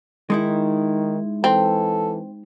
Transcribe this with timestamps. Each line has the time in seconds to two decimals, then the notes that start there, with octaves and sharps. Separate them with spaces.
0.30 D#3 G#3 D#4 E4
1.44 E3 C4 A4